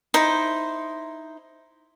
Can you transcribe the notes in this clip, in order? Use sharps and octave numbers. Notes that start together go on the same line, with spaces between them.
D#4 E4 C5